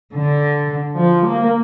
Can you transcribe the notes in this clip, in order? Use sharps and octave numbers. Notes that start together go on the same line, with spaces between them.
D3
F3
A#3